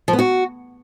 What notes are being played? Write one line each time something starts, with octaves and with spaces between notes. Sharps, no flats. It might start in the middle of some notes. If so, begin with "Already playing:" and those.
F3
B3
F#4